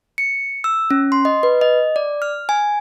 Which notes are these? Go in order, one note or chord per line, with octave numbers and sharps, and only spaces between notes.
C#7
E6
C#4
C6
D#5
B4
D#5
D5
F6
G#5